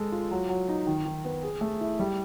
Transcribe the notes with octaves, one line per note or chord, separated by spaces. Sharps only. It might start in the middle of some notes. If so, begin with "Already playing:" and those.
Already playing: G#3 A4
F4
F#3
F#3
D#4
D#3
D#3
B3
G#4
A3
E4
G3